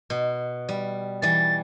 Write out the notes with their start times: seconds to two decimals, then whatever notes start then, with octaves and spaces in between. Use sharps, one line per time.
0.10 B2
0.69 G3
1.22 E3 G3 A6